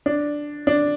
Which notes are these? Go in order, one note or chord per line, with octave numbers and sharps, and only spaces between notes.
D4
D4